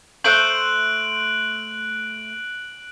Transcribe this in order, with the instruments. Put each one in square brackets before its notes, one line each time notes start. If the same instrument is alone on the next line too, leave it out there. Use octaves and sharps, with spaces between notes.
[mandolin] A3 C5 G6 [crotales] F#6 D7 F#7